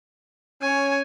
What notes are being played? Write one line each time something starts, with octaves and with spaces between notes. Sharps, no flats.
C#4 C#5 G#5